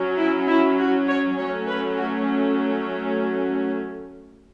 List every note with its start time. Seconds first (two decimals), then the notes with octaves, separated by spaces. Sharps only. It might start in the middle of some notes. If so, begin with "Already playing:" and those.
Already playing: F#3 C#4
0.18 E4
0.48 E4
0.79 F#4
1.07 C#5
1.37 F#3 A3 C#4 C#5
1.67 B4
1.96 F#4